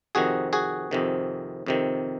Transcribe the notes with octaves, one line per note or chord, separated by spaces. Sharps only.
F2 C3 D#3 F#4 G#4
F#4 G#4
F2 C3 D#3
F2 C3 D#3